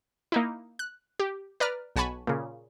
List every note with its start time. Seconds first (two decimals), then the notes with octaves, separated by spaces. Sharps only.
0.32 A#3 D#4 E4
0.79 F#6
1.19 G4
1.60 B4 D5 A#5 F6
1.96 B1 F#5 G#5 A5 B5 C#6
2.27 A#2 C#3